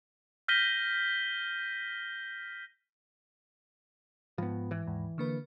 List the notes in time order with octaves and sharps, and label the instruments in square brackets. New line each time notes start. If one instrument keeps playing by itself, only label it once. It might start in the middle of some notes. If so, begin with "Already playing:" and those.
[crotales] F6 G6 A#6 B6 D#7 G7
[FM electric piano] G#2 [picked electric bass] F3 B3
[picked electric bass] E3
[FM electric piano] D#2 G#2
D3 A#3 B4